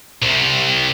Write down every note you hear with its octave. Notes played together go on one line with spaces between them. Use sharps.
C2 C3